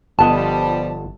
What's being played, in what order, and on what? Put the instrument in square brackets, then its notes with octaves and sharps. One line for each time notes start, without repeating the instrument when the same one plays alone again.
[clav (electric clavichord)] G1 B3 D#5 [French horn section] F3 G3 [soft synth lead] A5